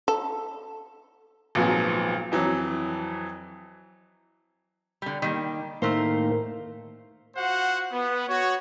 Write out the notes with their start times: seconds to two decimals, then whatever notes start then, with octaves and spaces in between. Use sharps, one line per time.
0.08 A4
1.55 G#1 A#2 F3 F#3 B3 G#5
2.32 F2 E3 F#3
5.02 D3 G3
5.22 D#3 G3 A#3
5.82 A2 D#3 A3 A#3 A#4 C5
7.36 F4 F#4 C5 F#5
7.92 B3
8.28 F#4 C#5